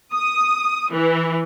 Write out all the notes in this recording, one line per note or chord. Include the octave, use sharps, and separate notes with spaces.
D#6
E3